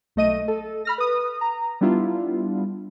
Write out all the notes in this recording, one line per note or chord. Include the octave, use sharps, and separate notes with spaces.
B1 A3 D#5 D#7
A4
B5 F6 A#6
B4 D#6
A#5
G3 B3 D4 E4 F4